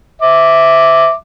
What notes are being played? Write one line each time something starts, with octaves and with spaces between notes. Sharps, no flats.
E5 D6